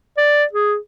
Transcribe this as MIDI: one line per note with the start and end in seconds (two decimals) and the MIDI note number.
0.17 0.44 74
0.53 0.76 68